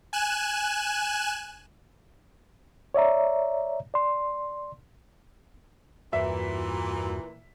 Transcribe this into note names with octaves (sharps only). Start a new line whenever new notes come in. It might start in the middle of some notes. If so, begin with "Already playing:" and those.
G#5 F#6 E7
C#5 D5 E5 A#5
D5 C6
E2 G2 A#2 E3 F#4 E5